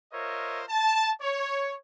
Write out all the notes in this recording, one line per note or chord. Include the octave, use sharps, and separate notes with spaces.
F4 A#4 C5 C#5 D#5 E5
A5
C#5